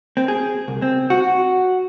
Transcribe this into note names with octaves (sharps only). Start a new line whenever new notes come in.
C4
G#4
C2
C4
F#4